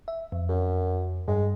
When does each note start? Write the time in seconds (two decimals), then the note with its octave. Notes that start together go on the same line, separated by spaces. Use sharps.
0.08 E5
0.32 F2
0.49 F#2
1.28 G2 G#3